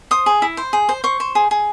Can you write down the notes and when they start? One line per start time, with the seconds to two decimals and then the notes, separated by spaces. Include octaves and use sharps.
0.11 C5 D#6
0.26 G#4
0.42 E4
0.57 C5
0.73 G#4
0.89 C5
1.04 C5 C#6
1.20 C5
1.35 G#4
1.51 G#4